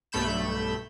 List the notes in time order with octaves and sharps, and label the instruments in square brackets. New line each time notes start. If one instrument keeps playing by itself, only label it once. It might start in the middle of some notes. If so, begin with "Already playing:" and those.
[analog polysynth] B1 G2 A3 B5 G6 E7